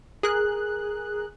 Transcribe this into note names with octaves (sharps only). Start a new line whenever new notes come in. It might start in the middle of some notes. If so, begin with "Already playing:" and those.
G#4 A#4 F#6